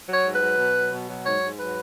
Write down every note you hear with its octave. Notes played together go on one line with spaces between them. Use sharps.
F#3
C#5
G#2
B4
F#3
B2
F#3
B2
F#3
G#2 C#5
G#2
F#3 B4